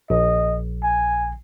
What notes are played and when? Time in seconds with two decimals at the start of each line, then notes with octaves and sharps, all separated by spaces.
0.10 A#1 D#5
0.83 G#5